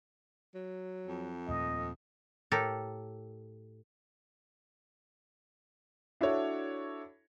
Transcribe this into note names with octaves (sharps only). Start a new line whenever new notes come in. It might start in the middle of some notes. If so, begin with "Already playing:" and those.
F#3
F2
D#2 A#2 A3 D#5
A2 G4 A4 A#4
D4 E4 F#4 A4 C#5